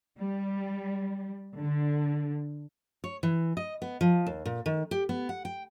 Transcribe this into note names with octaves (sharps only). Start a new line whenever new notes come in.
G3
D3
C#5
E3
D#5
B3
F3
D#2
A#2
D#3
G4
B3
F#5
G5